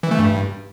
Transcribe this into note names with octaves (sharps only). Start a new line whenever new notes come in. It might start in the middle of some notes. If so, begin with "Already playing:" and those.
E3
A3
G2